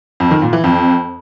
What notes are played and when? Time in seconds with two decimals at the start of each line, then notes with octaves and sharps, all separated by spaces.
0.20 F2
0.31 D#3
0.42 A#2
0.53 E3
0.64 F2